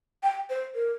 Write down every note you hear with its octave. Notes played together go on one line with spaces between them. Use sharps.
G5
C5
A#4